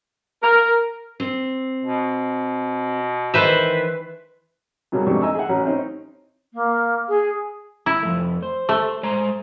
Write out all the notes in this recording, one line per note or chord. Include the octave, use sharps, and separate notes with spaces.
A#4
C4
B2
D#3 E3 B4 C5 E5
G2 B2 F#3 A#3 G#4
F2 G#2 C3 A3 D4 C#6
D#5 G#5 A#5 E6
G#4 E5 F#5
A1 F#3 C#4
C4 C#4 D#4
A#3
G#4
E4
F2 A3
C5
A3
G#3 C5 A#5